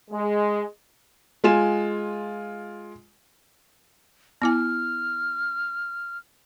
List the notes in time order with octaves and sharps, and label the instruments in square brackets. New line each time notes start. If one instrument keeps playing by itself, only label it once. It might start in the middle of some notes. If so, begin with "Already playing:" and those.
[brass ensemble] G#3
[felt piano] G#3 F4 G#5 E7
[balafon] B3 E4 G#5 [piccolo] F6